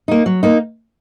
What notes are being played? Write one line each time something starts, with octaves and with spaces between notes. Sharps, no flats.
A#3 D#4
F#3
A#3 D#4